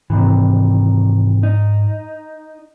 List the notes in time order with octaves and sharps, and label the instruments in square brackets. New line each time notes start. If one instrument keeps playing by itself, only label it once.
[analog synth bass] G#2 [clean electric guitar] C3 D#3 E3
[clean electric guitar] D#4